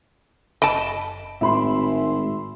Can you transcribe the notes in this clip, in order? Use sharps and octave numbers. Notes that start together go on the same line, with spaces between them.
F#1 D#5 A5 B5 D7
G#1 A2 E5 B5 C6